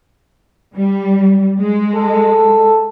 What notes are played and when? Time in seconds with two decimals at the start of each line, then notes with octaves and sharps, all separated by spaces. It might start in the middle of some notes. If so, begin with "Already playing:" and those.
0.75 G3
1.60 G#3
1.95 A4